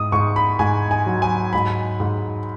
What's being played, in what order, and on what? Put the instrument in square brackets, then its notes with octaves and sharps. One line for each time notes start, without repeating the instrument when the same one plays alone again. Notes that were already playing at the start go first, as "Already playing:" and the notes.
Already playing: [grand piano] G#2 D#6
G#2 C#6
B5
G#2 G#5
G#5
F#3
G#5
G#2 B5
G#2